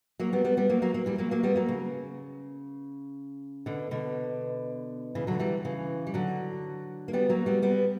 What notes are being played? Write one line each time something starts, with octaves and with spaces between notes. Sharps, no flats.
F#3 A#3
G3 B3
G3 B3
G3 B3
F#3 A#3
F#3 A#3
F#3 A#3
E3 G3
F#3 A#3
F#3 A#3
G3 B3
F#3 A#3
C#3
B2 D3
B2 D3
C#3 E3
D3 F#3
E3 G3
C#3 E3
G3
D3 F#3
A#3
G3 B3
F#3 A#3
G3 B3
G3 B3